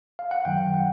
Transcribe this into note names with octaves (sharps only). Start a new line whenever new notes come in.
F5
F#5
F#2 D#3 F#3 G5
F#5